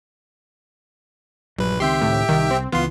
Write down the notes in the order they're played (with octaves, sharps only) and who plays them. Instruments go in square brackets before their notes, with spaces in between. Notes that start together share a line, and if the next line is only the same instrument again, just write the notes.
[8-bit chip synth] A#1 B4 [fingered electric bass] G2 F#3
[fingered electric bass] C#2 D#3 C4 [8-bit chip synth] G4 E5 G5 [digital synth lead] C6
[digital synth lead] A2
[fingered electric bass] C2 [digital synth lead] D#3
[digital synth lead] C4
[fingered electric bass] C#2 E3 [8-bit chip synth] B3 C6 [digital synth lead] F4